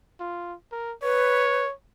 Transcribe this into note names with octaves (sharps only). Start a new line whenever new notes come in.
F4
A#4
B4 C#5